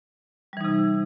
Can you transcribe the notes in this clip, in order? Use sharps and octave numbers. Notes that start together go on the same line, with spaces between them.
C3 E3 G3 D#4